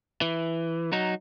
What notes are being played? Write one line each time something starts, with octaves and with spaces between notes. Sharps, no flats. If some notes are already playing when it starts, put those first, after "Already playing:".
E3
F#3 D#4